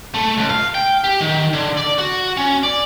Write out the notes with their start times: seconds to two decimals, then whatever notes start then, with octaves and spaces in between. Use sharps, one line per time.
0.14 A3
0.37 C#2
0.50 F5
0.75 G5
1.04 G4
1.21 D#3
1.53 D3
1.77 D5
1.98 F#4
2.37 C#4
2.63 D5